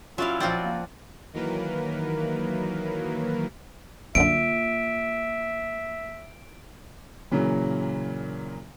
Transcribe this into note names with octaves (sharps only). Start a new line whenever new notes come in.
F#3 C#4 E4 F4 D5 F5
A#2 F3 C4 F4 F#4 D5
A#3
D#3 E3 F#3 A#3 A#4 B4
C2 F#2 D3 A#3 F4 E5 D7
A#2 C#3 E3 F#3